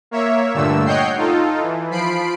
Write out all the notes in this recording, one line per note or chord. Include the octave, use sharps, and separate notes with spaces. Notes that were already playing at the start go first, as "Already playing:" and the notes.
A#3 C#5 E5
G2 A#2 D3 A3 E6
C#5 D#5 F#5 G5 G6 C7
D#4 F4 A4
E3
F3 B5 C7 D7